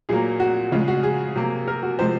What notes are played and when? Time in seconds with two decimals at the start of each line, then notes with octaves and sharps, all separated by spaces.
0.09 A#2 F#3 A#3 G#4
0.40 F#4
0.72 C#3 G#3 F4
0.88 F#4
1.03 G#4
1.36 C3 F#3 A#3
1.68 A#4
1.83 F#4
1.99 C3 F3 G#3 C5